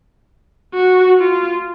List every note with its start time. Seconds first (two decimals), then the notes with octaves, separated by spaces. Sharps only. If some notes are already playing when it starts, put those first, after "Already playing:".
0.74 F#4
1.18 F4